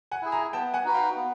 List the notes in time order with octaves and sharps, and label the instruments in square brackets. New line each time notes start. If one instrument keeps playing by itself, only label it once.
[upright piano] F#5 G#5
[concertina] E4 G#4
[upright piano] G#5 A#5
[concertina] B3 [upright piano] G5 A5
[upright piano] F#5 G#5
[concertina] D#4 F#4 B4
[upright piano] F5 G5
[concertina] B3